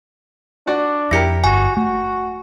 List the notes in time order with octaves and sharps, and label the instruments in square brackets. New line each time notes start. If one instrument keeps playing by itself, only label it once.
[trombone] D4 [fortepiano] F#4 D5 F#5
[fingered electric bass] F2 [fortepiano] E4 G4 A#4 [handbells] A#6 C#7
[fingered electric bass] G1 [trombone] F#4 [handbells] G#5
[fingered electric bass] A3 [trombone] F#4